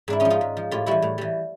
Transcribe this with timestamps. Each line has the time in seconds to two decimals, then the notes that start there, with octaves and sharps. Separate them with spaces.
0.08 G#2 D4 E4
0.20 C#4 D#4
0.25 F3
0.30 D#4 F4
0.41 G#2
0.57 F3
0.71 A2 F4 G4
0.86 E3 G3 E4 F#4
1.02 A2
1.18 E3 G3